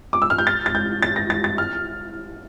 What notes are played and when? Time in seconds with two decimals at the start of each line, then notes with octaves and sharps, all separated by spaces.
0.13 D6
0.22 E6
0.30 F6
0.38 G6
0.47 A6
0.66 A6
0.75 G6
1.02 A6
1.16 A#6
1.30 A6
1.44 A6
1.58 F6